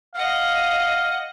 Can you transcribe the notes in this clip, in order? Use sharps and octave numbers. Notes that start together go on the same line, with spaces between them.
D#5 F5 F#5